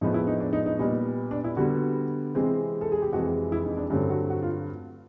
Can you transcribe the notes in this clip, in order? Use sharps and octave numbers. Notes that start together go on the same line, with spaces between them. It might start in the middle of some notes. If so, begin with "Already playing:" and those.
A2 F3 G#3 B3 D#4
E4
D#4
D4
D#4
D#4
A#2 G3 B3 D#4
D4
E4
D3 G3 B3 F#4
C3 E3 G#3 C4
A4
G#4
G4
F2 C3 E3 G#3 F#4
E4
D#4
D4
G2 D3 F#3 A3 C4 C#4
F#4
F#4
F4